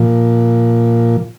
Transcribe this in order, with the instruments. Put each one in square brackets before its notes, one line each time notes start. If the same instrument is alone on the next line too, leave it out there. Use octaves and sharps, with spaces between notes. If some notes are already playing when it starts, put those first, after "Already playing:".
Already playing: [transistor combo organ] A#2 F3